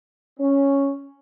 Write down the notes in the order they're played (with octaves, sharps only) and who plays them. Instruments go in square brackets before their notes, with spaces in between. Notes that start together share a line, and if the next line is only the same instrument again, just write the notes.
[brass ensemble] C#4